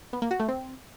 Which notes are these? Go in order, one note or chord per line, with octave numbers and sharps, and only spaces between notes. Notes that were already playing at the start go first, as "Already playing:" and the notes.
B3
A#3
F#4
A3
C4